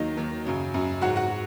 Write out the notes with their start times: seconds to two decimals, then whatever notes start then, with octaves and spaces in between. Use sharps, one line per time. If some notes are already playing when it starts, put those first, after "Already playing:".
Already playing: D#2 D#3 F#3 D#4 D#5
0.17 D#2 D#3 F#3
0.45 F#2 C#3 F#3
0.74 F#2 C#3 F#3
1.01 G#2 F#3 F#4 F#5
1.16 F#4 F#5